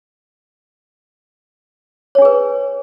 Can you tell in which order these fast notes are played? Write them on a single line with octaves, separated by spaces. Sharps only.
C#5 D4 G#4 B4